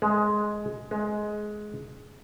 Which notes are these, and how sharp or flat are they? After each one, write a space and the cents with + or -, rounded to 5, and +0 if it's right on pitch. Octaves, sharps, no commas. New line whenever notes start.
G#3 +10
G#3 +15